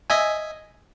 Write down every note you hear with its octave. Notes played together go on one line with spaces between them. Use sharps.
D#5 E5 G#5